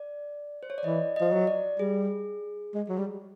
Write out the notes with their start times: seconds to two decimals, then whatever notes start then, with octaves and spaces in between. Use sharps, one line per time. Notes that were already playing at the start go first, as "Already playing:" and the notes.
Already playing: D5
0.63 C5
0.70 C#5
0.78 D5
0.84 E3 D#5
1.16 F3 D#5
1.32 F#3
1.47 D5
1.79 G3 G#4
2.74 G#3
2.89 F#3
2.98 G3